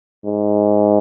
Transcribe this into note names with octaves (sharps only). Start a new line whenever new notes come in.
G#2